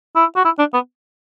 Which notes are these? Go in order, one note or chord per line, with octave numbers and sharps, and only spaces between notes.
E4
F#4
E4
D4
B3